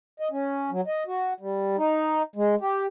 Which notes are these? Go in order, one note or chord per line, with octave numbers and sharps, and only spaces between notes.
D#5
C#4
F#3
D#5
F#4
G3
D#4
G#3
G4